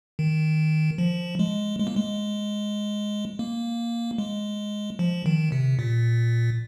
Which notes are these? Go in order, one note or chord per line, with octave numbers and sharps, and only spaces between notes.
D#3
F3
G#3
G#3
A#3
G#3
A#3
G#3
F3
D#3
C3
A#2